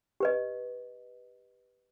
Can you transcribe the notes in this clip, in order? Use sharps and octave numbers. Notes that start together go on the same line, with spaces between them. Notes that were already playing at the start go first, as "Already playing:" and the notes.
G4 B4 D#5